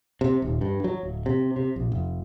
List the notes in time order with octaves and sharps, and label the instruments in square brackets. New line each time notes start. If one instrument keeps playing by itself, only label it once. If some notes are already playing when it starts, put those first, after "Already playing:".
[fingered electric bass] C3
D#1
G2
F#3
D1
C3
C3
A#1
F1